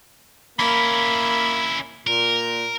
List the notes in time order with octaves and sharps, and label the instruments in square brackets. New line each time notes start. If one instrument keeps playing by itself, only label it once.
[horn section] A#3 B5 [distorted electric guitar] C#4 E4
[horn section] A#2 [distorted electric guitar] A#4